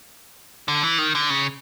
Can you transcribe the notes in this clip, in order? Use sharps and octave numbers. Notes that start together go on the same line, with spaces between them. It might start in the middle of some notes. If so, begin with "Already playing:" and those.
D3
E3
D#3
D3
C#3